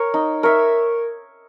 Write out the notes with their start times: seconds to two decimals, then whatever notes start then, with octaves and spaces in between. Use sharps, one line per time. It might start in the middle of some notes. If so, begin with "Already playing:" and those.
Already playing: A#4 C#5
0.14 D#4
0.43 A#4 C#5 E5